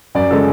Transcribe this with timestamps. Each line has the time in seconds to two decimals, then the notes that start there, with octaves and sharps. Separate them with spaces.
0.15 F#2 D5
0.31 C#3 G#3 A4